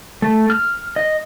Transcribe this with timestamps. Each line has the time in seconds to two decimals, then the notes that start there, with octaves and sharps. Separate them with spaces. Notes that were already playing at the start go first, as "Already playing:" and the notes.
0.22 A3
0.50 F6
0.96 D#5